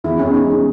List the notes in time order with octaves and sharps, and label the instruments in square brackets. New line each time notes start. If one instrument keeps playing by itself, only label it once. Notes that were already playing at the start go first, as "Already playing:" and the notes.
[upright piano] E2 [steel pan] E4
[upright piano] E2 [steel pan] C#4
[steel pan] D#4
[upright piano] G#3
[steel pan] C#4